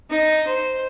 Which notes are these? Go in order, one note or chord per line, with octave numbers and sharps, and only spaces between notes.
D#4
C5